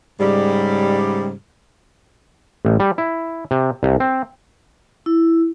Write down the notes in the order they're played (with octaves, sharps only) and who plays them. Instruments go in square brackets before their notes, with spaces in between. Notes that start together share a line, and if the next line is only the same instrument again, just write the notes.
[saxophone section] G#2 C#3 G3
[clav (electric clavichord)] A1
G3
E4
C3
C2
C4
[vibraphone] E4